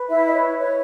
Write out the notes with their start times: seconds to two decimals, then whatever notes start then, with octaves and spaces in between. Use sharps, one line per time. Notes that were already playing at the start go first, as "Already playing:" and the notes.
Already playing: B4
0.10 E4 E5
0.27 D#5
0.34 C#5
0.59 C#5